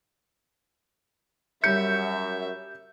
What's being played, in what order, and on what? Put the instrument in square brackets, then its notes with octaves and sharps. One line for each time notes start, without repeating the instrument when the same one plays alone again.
[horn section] F#2 [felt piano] G3 C#7 [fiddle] E5 [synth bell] G6